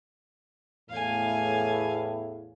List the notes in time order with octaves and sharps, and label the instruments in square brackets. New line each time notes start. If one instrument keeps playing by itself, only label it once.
[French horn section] E2 A2 [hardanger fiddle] F5 G#5